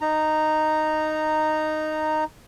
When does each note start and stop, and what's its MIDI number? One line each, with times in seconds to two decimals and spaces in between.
0.01 2.24 63
0.01 2.24 82